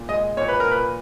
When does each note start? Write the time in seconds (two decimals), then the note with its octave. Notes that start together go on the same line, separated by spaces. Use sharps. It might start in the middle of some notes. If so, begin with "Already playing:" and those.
Already playing: A#2
0.09 G#3 D#5
0.37 A#2 C#5
0.48 B4
0.60 A#4
0.66 A#2
0.71 B4